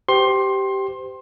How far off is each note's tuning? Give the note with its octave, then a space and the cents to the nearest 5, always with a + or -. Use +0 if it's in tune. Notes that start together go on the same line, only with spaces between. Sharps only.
G4 -10 C5 -30 C6 +20